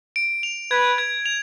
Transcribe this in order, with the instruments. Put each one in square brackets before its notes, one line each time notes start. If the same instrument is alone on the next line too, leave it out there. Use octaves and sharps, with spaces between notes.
[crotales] D7
F7
[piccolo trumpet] B4 [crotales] G#6
[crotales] G#6
F7